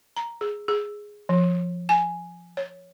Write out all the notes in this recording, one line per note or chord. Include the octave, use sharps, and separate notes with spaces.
A#5
G#4
G#4
F3
G#5
C#5